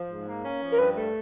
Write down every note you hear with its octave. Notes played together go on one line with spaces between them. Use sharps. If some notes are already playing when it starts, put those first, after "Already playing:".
Already playing: F3
G#2
A#3
C#4
F3
A#4
G2 B4
A3